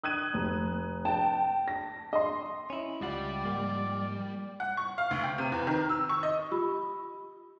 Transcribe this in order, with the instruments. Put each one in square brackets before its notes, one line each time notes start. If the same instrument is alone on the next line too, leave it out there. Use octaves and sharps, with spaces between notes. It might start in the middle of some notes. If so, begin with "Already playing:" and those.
[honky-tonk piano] D#6 F#6 G#6 D#7
F1
G5 A5
A#6
D#5 C6
[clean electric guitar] C#4 E4
[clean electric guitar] C#2 F4 F#5 [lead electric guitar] G3 [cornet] D5
[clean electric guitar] G#2 F3 A#3
[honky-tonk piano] F#5
C#6
F5
D2
G5
C3
E2
D#3
E6
C#6
D#5
[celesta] F4 G4 B5 E6